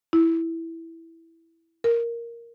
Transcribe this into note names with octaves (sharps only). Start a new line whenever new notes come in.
E4
A#4